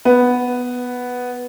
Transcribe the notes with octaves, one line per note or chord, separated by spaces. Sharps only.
B3